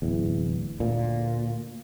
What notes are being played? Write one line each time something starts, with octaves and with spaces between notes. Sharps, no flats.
D1 E2
D2 A#2